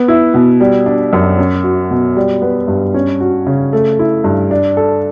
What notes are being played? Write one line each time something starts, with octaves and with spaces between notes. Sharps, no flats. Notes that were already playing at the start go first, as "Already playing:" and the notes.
Already playing: B3
E4
B2
G3
D4
F#2
C#4
F#4
B2
G3
B3
G2
C#4
F#4
C#3
A3
E4
G2
D4
A4